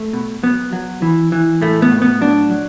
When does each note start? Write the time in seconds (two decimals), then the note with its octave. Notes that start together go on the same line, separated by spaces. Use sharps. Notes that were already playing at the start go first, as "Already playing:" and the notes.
Already playing: A3
0.13 B2
0.43 F#3 B3
0.73 F#3
1.02 E3
1.32 E3
1.62 A2 A3
1.82 B3
1.92 A2
2.02 B3
2.21 F#3 D4
2.51 F#3